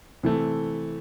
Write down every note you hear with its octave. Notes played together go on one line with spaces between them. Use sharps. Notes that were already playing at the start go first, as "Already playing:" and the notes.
C3 E3 A3